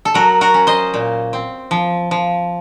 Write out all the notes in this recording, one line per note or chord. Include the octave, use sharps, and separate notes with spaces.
A4
F#3 F#4 A#4
F#4 A#4
C#4
C5 D#5
A#2
C4
F3
F3